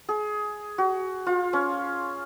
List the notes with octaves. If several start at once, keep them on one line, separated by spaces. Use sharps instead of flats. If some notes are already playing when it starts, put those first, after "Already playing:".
G#4
F#4
F4
C#4